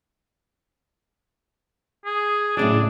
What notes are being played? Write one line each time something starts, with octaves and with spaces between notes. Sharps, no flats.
G#4
A2 C#3 F#3 D4